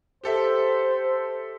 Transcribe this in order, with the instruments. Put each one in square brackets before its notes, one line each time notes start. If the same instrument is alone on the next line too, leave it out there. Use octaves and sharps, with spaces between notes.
[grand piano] G4 A4 E5 [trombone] C5